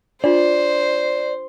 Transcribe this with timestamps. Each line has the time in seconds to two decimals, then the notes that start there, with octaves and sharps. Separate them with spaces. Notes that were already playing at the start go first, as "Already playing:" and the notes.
0.24 D4 F4 C5 D5